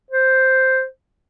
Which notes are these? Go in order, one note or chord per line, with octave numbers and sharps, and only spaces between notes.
C5